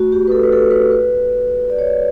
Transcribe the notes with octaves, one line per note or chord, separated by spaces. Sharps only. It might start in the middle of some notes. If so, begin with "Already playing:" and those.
Already playing: A3 F#4
G4
B4
A4
B4
A4
B4
B4
D5
C#5
D5